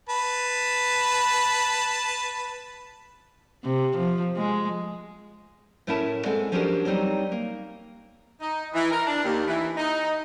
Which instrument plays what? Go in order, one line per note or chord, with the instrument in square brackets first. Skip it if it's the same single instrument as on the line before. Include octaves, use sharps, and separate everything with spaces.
[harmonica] B4 A5
[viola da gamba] C3
F3
G#3
[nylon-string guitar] A2 A3 C#4 E4 A#4 A5
G#3 C4 A4 F#5
F3 F#3 C#4 D4 G4 A#4
F#3 G3 C4 D#4
A#3
[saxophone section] D#4
E3
A#4
D4
D#2
E3
D#4